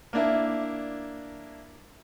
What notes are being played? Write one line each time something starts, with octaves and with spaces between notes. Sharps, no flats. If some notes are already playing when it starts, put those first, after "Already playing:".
A#3 D4 E4